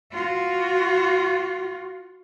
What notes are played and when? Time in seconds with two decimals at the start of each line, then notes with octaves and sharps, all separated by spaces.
0.12 F4 F#4